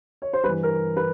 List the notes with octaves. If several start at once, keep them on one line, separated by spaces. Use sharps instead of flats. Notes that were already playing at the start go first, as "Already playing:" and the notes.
C#5
C5
G2 E3 B4
A#4
B4